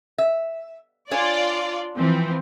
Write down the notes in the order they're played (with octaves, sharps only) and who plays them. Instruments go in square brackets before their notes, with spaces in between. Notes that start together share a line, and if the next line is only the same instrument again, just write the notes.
[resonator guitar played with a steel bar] E5
[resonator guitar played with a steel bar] D4 C#5 G#5 [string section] F4 D5
[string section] E3 F3 C4